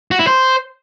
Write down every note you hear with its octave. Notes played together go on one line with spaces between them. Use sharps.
F#4
E4
C5